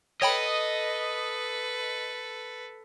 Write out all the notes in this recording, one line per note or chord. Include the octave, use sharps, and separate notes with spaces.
A4 B4 C#5 D#5 G5 B5